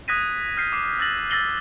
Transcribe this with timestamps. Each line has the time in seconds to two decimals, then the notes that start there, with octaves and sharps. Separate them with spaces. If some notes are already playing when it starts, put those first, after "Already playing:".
0.08 D#6 F#6 G#6 A#6 B6 D#7
0.57 F6 G6 B6 C7
0.72 D6 C7
0.99 E6 F#6 A6 A#6 F#7
1.31 E6 A6 A#6 C7 F#7 G7